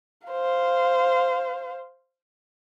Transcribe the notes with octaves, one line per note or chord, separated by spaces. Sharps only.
C5 F5